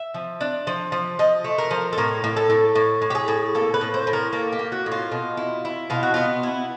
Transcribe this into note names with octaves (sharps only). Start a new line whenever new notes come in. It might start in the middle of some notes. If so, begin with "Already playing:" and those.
Already playing: E5
F3
D4
F3
F3
F3 D#5
A3
A#4
F3
A4
A2 A#4
A2
A4
A2
A2
A2
G4
G#4
A2
A#3 A4
B4
A2
C5
A2
A#4
A#3 A4
G4
A#3
F#4
A2
F4
B2
E4
E4
B2 F4
F#4
B3 F4
E4